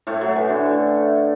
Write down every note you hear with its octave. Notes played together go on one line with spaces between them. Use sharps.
A2 A3
F#3
E3
D3